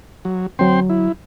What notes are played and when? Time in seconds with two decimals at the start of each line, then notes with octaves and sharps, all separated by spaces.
0.25 F#3
0.59 D2 F#3 C4 G5 C6
0.89 E4